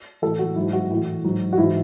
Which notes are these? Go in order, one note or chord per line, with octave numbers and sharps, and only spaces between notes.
A2 E3 A4
F#4
G#2 F#3 E4
F#4
A2 E3
G#2 F#3
F#4
G#2 E3 E4